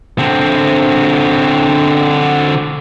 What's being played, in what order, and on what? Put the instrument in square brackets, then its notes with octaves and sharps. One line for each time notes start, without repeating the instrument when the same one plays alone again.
[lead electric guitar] D3 C4